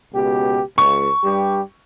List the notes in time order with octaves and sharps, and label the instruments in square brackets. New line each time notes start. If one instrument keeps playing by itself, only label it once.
[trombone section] C#2 B2 G4
[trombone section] C#2 [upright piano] C#6
[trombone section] G2 G3 G4